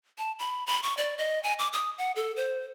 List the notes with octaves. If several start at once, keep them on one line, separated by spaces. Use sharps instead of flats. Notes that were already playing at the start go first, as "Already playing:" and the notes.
A5
B5
B5
C#6
D5
D#5
G#5
D6
D#6
F#5
A4
C5